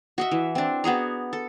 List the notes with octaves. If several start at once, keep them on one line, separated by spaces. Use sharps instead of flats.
F#4 D#5 E5
E3
C4 D4
B3 F#4 G#4 A#5
A4